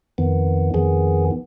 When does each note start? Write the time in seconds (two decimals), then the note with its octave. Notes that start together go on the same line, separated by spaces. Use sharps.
0.18 F2 D#3 B3
0.74 F2 D#3 B3 G#4